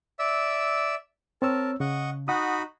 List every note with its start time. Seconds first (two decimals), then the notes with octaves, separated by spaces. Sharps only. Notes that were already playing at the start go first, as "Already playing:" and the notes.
0.19 D5 E5 E6
1.42 C4 A#4 C#5 A5 E6
1.80 C#3 D#5 F#5 C#6
2.28 D#4 F#4 F#5 B5 D#6